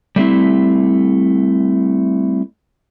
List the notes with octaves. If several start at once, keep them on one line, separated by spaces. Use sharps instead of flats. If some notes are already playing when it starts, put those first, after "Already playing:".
G3 A3 C4 E4